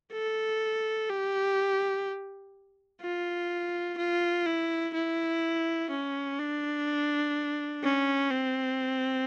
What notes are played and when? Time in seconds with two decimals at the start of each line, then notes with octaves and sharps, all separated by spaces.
0.13 A4
1.10 G4
3.02 F4
3.98 F4
4.46 E4
4.94 E4
5.90 C#4
6.39 D4
7.83 C#4
8.31 C4